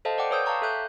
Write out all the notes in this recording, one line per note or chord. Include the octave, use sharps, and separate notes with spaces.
A4 C5 D#5 F5 A5
D5 F#5 G5 D6
B4 C#5 D#6 E6 G6
F5 G5 A5 A#5 C#6 D6
A4 E5 F#6 G6